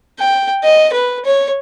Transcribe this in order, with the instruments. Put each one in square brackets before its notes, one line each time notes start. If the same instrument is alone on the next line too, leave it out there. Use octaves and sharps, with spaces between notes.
[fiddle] G5
D#5
B4
C#5